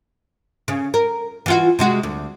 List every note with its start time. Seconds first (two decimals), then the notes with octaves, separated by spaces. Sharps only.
0.68 C#3
0.94 A#4
1.46 E3 F4 F#4
1.79 C3 G#3 F#4
2.03 D2